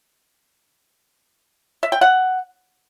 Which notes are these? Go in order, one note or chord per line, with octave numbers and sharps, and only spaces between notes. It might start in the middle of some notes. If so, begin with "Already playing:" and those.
E5
G5
F#5